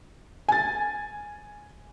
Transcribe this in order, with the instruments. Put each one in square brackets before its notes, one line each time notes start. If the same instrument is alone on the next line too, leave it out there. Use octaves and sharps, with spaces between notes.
[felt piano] G#5 A6